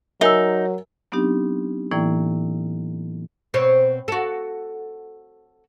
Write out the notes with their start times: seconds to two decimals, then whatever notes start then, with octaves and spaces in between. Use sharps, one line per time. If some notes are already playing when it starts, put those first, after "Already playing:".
0.21 F#3 D#4 A#4 E5 G#5 E6
1.12 F#3 B3 C4 D4 D#4 G4
1.91 A2 E3 A#3 E4 D5 G5
3.54 B2 C4 C#5
4.08 F#4 A4